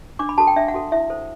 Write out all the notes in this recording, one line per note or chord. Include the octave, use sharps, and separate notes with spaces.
D4 D6
B5
F#4 A4 A5
G5
D4 E5
F#5
F#4 A4
E4 E5
A4 C5